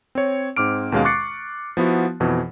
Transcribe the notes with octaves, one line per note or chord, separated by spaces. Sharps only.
C4 C#5
G#2 C4 D6 F6 D7
D#2 B2 G#3 C#4 F5
C#6 D6 F#6 A6 C7 C#7
F3 B3 E4 F#4
F2 B2 E3